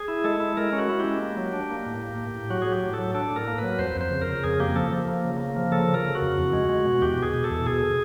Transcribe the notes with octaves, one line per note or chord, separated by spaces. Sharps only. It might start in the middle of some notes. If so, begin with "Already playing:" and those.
Already playing: G#4
E4
G#3 A4
E4
G#3 A#4
C#4
F#4
E4
G4
G#3
A#3
F#3
D4
A#3
A2
A#3
A2
A2
F#3 F#4
F#3 G#4
G4
A2
F#3 A4
D4 A4
A2
A#4
A#3
F#3 B4
F2 C5
F2
C5
C#3
A#4
C#3
F2 G#4
A#3 G4
F3 A4
F3
A#3
C#3
A#3
F3
C#3 A4
C#3
A#4
C#3
F#4
F2
E2
G#3
G#3
B2
E2 G4
B2 G#4
B2
A4
E2
B2 G#4